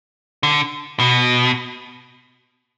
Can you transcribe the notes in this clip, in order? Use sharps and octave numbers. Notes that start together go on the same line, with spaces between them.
D3
B2